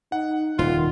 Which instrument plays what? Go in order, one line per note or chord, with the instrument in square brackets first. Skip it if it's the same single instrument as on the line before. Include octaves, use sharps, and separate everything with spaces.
[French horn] D#4 [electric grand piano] F#5
[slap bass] D#1 C3 [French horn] D#3 [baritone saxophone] F4